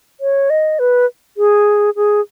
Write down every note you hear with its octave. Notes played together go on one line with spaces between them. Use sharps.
C#5
D#5
B4
G#4
G#4